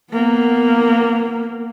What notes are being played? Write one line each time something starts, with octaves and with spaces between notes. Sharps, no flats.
A#3 B3